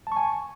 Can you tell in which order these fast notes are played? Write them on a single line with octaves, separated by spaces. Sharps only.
A5 C#6 G#5